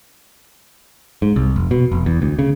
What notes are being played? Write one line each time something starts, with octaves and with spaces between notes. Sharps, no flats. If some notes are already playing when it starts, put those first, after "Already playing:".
G#2
C2
F1
B2
F1
E2
D2
C#3